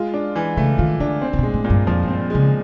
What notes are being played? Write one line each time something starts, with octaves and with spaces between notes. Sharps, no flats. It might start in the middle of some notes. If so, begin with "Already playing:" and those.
Already playing: G#3 F4
D4
E3
C#3 A3
D#3 F4
D3 D4
C4
C3
B2 G#3
A2
A#2
G2
F2 F3
G2 C4
C#3 G#3